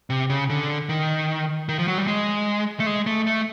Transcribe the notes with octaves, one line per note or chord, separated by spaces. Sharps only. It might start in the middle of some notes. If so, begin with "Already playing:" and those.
C3
C#3
D3
D#3
D#3
F3
F#3
G3
G#3
A3
G#3
A3
A3